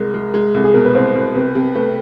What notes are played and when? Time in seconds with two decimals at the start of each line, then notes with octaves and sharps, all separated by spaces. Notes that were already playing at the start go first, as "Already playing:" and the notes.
Already playing: C2 G#3 A#4
0.14 G#3
0.34 G#3
0.54 C2 A4
0.64 G#4
0.74 B2 A#4
0.85 B4
0.95 C2 C5
1.15 C2
1.35 C3 B4
1.55 C3
1.75 A3 B4